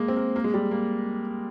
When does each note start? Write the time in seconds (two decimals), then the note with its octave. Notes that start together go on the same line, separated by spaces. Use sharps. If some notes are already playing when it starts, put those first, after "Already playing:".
Already playing: G#3 A#3
0.08 C4
0.17 A#3
0.36 A#3
0.44 G#3
0.54 G3
0.71 A#3